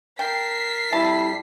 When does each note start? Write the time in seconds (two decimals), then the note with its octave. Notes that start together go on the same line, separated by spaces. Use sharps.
0.19 A#4 G5 A5 B6 C7
0.93 F2 G3 E4 A5